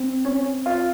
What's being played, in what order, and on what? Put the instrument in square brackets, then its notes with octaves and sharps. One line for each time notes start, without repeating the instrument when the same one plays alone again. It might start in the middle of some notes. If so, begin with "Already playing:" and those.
Already playing: [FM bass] C4
[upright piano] C#4
F4